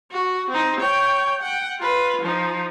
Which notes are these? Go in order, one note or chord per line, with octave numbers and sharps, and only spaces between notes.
F#4
C4 D#4
C#5 G5
F#5 G5
F4 B4
F3 D#4